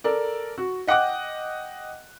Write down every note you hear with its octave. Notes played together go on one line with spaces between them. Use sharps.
A4 A#4 D5
F#4
D#5 F#5 G5 D6 F#6